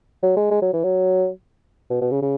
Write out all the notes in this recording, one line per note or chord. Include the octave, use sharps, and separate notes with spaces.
F#3
G#3
G#3
F#3
E3
F#3
B2
B2
C#3
C#3